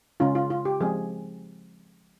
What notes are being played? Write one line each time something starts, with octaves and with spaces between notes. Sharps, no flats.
C#3 G#3 C#4 F4
F4
F4
G4
F3 G#3 C4 G#4